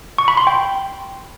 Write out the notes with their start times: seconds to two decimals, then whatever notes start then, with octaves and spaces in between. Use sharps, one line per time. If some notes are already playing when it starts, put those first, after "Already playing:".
0.18 C#6
0.28 B5
0.37 C6
0.47 G5